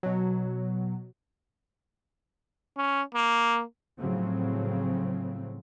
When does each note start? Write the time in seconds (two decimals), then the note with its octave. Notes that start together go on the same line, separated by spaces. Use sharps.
0.03 B2 F#3
2.77 C#4
3.14 A#3
3.98 A2 C#3 F3 F#3 C4